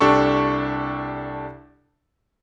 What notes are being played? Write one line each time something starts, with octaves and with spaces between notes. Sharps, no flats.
C2 D4 G4 A4 C#6